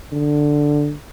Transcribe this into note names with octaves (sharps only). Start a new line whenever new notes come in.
D3